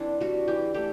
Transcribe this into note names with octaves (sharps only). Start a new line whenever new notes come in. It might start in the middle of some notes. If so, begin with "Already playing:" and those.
Already playing: E3 C4 D4
G3 F#4
E3 G4
A3 G4